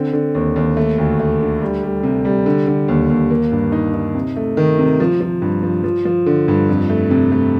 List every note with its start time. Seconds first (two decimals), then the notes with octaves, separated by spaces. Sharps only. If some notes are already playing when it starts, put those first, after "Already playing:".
Already playing: D3 C4
0.13 D3
0.35 D#2
0.56 D#2
0.77 A3
0.98 D2
1.20 A3
1.40 D3
1.62 G3
1.83 G3
2.03 C3
2.25 G3
2.46 D3
2.67 D3
2.88 D#2
3.10 D#2
3.30 A#3
3.52 G2
3.72 D#4
3.94 D#4
4.15 C3
4.36 A3
4.57 D#3
4.79 C3
5.00 F3
5.21 F3
5.42 G2
5.63 F3
5.84 F3
6.05 F3
6.26 D3
6.48 G2
6.69 F2
6.90 A3
7.11 C3
7.32 A3